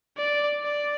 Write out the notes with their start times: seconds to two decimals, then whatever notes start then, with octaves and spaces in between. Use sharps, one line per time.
0.18 D5
0.64 D5